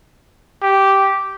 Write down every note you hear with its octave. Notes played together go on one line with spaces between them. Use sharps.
G4